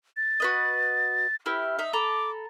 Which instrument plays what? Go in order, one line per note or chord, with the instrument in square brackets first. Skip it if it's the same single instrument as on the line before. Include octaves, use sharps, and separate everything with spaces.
[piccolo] A6
[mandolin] F#4 B4 D#5
[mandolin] E4 G4 B4 [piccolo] F6
[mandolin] D#4 E5
[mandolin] A4 A#5 B5 [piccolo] D6